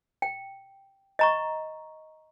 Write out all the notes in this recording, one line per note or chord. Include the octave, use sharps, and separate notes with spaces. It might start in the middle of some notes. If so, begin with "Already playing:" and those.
G5
D#5 A#5 C#6